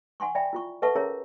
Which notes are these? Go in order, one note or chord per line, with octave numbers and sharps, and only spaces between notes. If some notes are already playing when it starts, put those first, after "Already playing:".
F#5 G#5 C6 C#6
D5 E5 G5 B5
E4 F4 C#6
A4 B4 E5 F#5 A5 C#6
C#4 G#4 A#4 C#5 E5 A#5